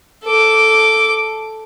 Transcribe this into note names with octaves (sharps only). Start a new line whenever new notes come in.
A4 D6